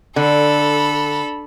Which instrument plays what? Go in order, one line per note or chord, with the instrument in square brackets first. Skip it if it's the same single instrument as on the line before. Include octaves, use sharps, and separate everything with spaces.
[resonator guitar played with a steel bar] D3 [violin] A4 B5